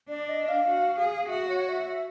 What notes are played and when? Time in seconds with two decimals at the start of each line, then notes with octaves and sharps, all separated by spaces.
0.09 D4 D5
0.29 D#5
0.49 F5
0.68 F#4
0.99 G#4
1.28 F#4 E5
1.49 C#5
1.69 E5
1.89 E5